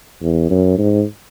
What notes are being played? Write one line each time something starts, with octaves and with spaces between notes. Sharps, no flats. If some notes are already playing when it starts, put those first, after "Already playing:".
E2
F#2
G#2